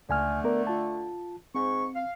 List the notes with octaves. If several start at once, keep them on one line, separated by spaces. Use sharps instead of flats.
C#2 D3 A3 G#5 F6
B3 A#4 D5
F4 A5
G#2 C4 C#6
F5